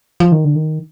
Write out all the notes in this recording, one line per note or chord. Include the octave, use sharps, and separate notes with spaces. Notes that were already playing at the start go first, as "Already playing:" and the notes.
F3
D#3
D3
D#3